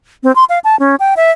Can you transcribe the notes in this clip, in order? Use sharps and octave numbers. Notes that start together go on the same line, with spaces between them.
C4
C6
F5
A5
C#4
G5
E5